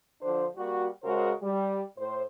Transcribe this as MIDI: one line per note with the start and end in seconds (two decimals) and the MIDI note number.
0.21 0.45 50
0.21 0.45 53
0.21 0.45 62
0.21 0.45 72
0.55 0.86 55
0.55 0.86 58
0.55 0.86 66
1.03 1.31 49
1.03 1.31 56
1.03 1.31 66
1.03 1.31 70
1.03 1.31 72
1.42 1.81 55
1.97 2.22 45
1.97 2.22 72